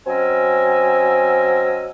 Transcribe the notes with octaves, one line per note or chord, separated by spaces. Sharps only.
F#3 C4 C#4 D#5 G#5 E6